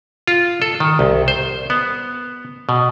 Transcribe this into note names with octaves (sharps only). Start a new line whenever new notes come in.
F4
A4
D#3
C2
C5
B3
B2